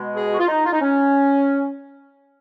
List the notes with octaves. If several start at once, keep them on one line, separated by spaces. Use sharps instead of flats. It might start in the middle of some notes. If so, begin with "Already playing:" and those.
Already playing: B2 G#3
G#4
F#4
F4
D#4
F4
D#4
C#4